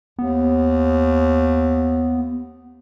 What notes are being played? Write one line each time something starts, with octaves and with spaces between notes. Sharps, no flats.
D#2 B3